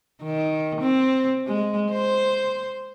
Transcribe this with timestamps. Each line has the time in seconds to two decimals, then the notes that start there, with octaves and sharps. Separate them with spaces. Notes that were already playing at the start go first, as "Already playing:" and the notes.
0.23 D#3
0.81 C4
1.47 G#3
1.91 C5